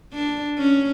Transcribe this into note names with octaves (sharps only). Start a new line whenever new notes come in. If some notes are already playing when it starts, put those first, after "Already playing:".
D4
C#4